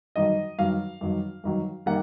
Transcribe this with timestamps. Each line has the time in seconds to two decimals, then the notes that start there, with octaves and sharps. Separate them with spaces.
0.16 G2 D#3 F#3 D#5
0.59 G2 D#3 F#3 F5
1.01 G2 D#3 F#3
1.44 G2 D#3 F#3
1.86 D#3 G3 A#3 F#5